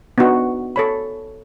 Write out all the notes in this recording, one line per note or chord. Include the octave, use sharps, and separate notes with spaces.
B3 D4 D#4 F#4
A4 C#5 B5